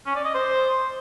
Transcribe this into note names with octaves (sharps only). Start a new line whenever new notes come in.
C#4
D5
D#5
C5